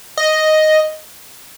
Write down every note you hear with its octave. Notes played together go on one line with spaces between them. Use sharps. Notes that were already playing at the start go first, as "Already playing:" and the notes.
D#5